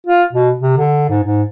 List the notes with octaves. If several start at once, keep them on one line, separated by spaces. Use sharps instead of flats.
F4
B2
C3
D3
G#2
G#2